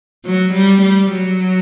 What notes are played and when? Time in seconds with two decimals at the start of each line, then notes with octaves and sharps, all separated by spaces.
0.24 F#3
0.53 G3
0.82 G3
1.11 F#3